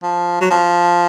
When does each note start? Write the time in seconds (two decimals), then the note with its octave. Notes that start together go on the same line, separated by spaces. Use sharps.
0.03 F3
0.41 F#3
0.51 F3